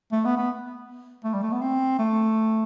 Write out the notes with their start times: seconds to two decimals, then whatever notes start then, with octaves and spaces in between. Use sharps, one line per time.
0.12 A3
0.25 B3
0.37 B3
1.24 A3
1.34 G3
1.43 A3
1.52 B3
1.61 C4
1.99 A3